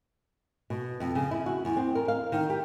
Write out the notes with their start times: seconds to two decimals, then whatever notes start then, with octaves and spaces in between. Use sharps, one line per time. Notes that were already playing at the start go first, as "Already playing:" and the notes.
0.70 B2
1.00 F2
1.15 C#3
1.31 E4
1.46 F#4
1.65 E2
1.77 C4
1.95 A#4
2.08 F5
2.32 D#3
2.50 G4